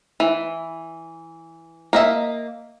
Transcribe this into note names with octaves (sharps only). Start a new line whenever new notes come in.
E3
A#3 D#5 E5